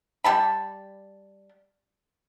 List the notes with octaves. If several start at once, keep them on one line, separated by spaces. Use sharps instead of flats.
G3 A5 B5